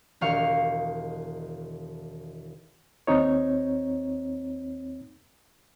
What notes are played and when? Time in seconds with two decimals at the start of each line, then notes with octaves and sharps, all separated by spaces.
0.21 E1 D#3 G4 F5 C#6 F6
3.07 D#2 C4 D#4 C#5